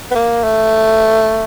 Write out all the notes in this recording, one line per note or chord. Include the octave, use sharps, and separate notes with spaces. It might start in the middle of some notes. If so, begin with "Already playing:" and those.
B3
A#3
A3